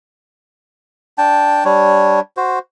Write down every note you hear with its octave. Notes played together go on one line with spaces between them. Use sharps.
D4 G5 A5
G3 D4 C#5
F#4 C5